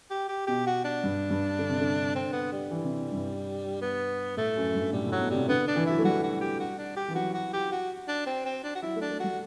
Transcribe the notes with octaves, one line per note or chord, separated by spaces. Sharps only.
G4
G4
B2 G4
F#4
D4
G2
G2
D3
C3
D3
C4
B3
G3
E3
C3
G2
B3
A2 A3
F#2
G2
A2 G3
A2
F#3
B2
C3 G3
D3 B3
D4
E3
F#3 E4
A3
G3 F#4
F#4
G4
F#4
D4
G4
E3
F#3 F#4
F#4
G4
F#4
D4
C4
C4
D4
F#4
F#3 E4
A3
D4
A3
G3 F#4